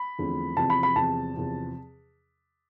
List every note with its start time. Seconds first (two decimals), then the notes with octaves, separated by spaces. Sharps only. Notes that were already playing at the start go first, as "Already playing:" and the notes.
Already playing: B5
0.18 E2 D3 F3 A3 C4
0.57 E2 C3 F3 C4 A5
0.70 B5
0.83 B5
0.96 E2 C3 F3 C4 A5
1.34 E2 C3 F3 C4